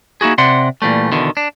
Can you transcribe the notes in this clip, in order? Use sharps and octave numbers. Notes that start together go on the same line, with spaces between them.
A#3 D#4 E4 F#4 G#4
C3 D5 F#5 C6
A#2 E3 G3 A3
E2 B2 D3 D#3
D4